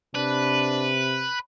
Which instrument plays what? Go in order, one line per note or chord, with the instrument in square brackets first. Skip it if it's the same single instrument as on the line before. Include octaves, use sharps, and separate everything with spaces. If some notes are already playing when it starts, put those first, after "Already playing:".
[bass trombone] C3 [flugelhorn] D4 [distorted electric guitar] B4